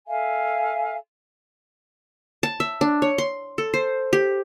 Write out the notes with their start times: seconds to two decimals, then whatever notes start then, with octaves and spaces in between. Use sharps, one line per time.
0.07 A4 E5 F5 G#5
2.43 A5
2.60 E5
2.81 D4
3.02 C#5
3.18 C6
3.58 A4
3.74 C5
4.13 G4